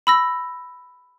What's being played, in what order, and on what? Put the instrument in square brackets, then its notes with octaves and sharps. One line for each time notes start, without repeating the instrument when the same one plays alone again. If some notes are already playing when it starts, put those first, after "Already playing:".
[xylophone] B5 E6 A#6